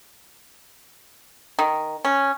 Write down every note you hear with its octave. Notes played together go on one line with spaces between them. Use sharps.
D#3
C#4